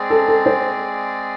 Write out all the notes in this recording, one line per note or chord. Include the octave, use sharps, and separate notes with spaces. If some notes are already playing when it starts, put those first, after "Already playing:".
Already playing: G#3 C4 G#4 D5
A4
A4
C5